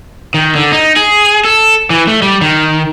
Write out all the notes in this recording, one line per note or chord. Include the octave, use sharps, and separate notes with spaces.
D#3
D3
D#4
G#4
A4
E3
A3
G3
D#3